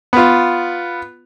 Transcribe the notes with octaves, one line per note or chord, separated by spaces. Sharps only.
B3 F4